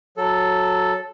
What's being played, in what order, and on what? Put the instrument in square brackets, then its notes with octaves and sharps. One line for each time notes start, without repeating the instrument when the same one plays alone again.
[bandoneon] F#3 A4